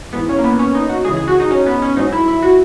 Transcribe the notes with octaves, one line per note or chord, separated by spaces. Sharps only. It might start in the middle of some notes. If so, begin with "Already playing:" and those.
G#2 E3 B3
C#4
A#3
B3
C#4
D#4
F#4
C#2 C#3 E3 G#4
G#4
F#4
D#4
C#4
B3
C#4
G#2 F#3 D#4
E4
E4
F#4